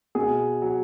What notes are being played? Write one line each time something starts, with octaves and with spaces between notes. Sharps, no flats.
B2 G#4
F#3